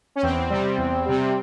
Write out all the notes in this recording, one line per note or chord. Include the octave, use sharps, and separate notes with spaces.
C#4
E2 C4
C3 G3
E2
C3 G3